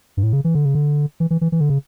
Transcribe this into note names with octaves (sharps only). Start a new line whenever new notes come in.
G2
A2
C#3
E3
D3
C#3
D3
E3
E3
E3
E3
D3
C#3